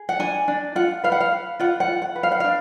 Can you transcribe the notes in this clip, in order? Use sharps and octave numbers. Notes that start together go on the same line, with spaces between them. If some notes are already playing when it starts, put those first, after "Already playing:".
Already playing: G#4
F#5
D4 G#5
D4
F4 F#5
B4 F5
F#5
F5
B4
F4 F#5
F#5
F4
F#5
B4
F5
F#5
D4 F5